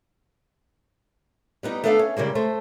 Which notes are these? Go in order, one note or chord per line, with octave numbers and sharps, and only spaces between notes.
G3 B3 D#4
A3 B3 D4 A4 D#5 F5
C#4
C#3 G3 G#3 A#3
A3 C5